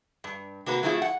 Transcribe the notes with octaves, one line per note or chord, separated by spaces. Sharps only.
G2
C3 A#3 F#4 B4
F#3 A3 C4 E4 F4 G#4
F#5